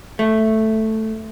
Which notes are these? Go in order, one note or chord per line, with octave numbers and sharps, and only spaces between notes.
A3